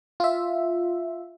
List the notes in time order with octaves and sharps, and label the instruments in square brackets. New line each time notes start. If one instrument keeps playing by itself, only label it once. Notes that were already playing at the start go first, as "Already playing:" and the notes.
[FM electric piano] F4 E5